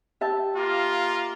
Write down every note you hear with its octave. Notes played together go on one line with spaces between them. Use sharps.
G4 E5 A5
A#3 F4